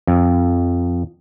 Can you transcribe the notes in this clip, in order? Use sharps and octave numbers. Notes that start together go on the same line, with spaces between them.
F2